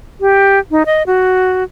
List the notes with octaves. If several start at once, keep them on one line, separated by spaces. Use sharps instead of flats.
G4
D#4
D#5
F#4